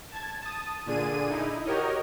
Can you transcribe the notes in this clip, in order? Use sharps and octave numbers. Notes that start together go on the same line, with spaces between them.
A5 G#6
A5 D#6
A#2 D3 D4 G#4 D#7
D#4 E4
F#4 G4 A#4 C#5 D#5